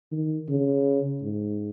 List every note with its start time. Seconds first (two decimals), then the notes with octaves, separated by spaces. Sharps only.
0.12 D#3
0.49 C#3
1.22 G#2